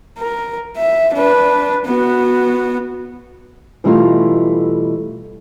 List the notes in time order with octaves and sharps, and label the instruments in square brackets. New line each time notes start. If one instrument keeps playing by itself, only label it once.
[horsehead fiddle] A#4
E5
D4 B4
B3 F#4
[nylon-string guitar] B2 E3 G3 A3 D#4 F4